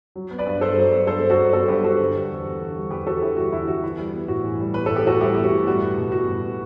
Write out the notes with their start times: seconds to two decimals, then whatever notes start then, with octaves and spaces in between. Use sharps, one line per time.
0.16 F#3
0.31 B3
0.39 B4 D5
0.46 G2
0.61 G2 A4 C5
0.77 F#3
0.92 B3
1.07 G2 A4 C5
1.23 G2
1.30 F#4 A4
1.38 F#3
1.53 B3 F#4 A4
1.68 G2 G4 B4
1.84 G2 F#4 A4
1.99 D3
2.15 G3
2.29 E2
2.46 E2
2.61 D3
2.76 G3
2.90 E2 G4 B4
3.07 E2 F#4 A4
3.21 D3 E4 G4
3.37 G3 F#4
3.53 E2 E4
3.68 E2 F#4
3.84 E3 E4
3.98 G3
4.13 B3
4.28 A2 F#4
4.44 E3
4.60 G3
4.74 B3 B4
4.86 A2 A4
4.96 G4
5.05 E3 F#4 A4
5.20 G3 E4 G4
5.35 B3 G4
5.44 F#4
5.51 A2
5.67 G3 F#4
5.82 B3
5.97 B2
6.12 B2 F#4
6.27 G3
6.44 B3